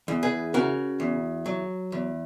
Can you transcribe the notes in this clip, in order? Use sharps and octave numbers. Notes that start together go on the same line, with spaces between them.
E2
G#4 B4
C#3 F#4 A#4
E2
F#3
E2